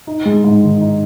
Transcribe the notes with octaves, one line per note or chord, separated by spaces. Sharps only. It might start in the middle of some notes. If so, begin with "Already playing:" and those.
D#4
G#3
G#2
D#3
D#4